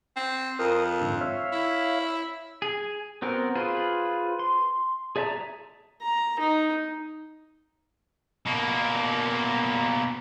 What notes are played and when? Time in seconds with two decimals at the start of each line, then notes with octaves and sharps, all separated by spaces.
0.16 C4
0.59 F2 A#4 D#6
1.01 G#2 D3
1.21 C#5 E5 F5
1.52 E4
2.62 G#4
3.22 B3 C4 F#4 A#4
3.55 F4 G#4 B4 C5
4.39 C6
5.16 G#4 D5 E5 A5 A#5
6.02 A#5
6.40 D#4
8.46 B2 A#3